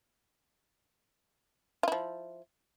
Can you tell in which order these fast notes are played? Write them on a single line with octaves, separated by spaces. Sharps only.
F4 E4 F3